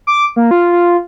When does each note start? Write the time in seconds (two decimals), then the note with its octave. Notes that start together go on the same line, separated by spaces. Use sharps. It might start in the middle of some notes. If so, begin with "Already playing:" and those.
0.07 D6
0.36 A#3
0.51 F4
0.72 F4